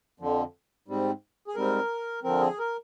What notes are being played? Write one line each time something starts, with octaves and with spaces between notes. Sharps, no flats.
F2 D3 F3
G#2 G3 C4
G#4
G#2 G3 C4 A#4
D3 F3 C4 A#4
G#4
A#4